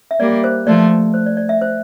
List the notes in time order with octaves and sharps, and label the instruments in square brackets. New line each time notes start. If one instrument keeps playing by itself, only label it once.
[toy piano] E5
[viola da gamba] G3 A#3 [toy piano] D5
[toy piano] C5
[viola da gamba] F3 A3 [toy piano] D5
[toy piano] C5
D5
D5
E5
C5